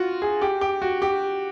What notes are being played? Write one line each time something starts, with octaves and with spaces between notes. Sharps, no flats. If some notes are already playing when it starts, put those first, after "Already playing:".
Already playing: F4 F#4
G#4
G4
G4
F#4
G4